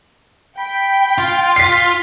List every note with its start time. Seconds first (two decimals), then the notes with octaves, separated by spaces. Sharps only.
0.58 G5 B5
1.18 F4 C6
1.56 B6 C7